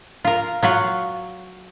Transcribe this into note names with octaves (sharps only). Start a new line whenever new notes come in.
F4 A#4
F#3 F4 F#4